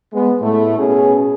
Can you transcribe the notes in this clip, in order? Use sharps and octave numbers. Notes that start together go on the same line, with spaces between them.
G#3 B3
A2 A3
B2 C#4 G#4